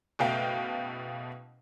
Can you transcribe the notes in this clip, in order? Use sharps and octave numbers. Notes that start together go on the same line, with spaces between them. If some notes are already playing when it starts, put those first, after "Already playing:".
F#1 B2 A3 F5 G5